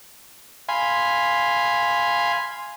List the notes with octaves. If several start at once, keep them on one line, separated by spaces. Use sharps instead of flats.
F5 G#5 B5 C6